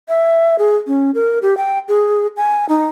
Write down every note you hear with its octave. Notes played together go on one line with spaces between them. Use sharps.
E5
G#4
C#4
A#4
G4
G5
G#4
G#5
D#4